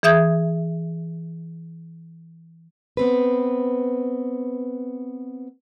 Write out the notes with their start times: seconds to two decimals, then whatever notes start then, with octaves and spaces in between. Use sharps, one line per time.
0.03 E3 G#4 E5 D#6 G6 G#6
2.97 B3 C4 B4